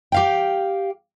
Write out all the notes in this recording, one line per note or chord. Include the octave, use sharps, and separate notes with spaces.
G4 F5 G5